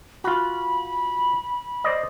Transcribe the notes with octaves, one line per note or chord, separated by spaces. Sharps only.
F4 F#4 B5
C5 D5 D#5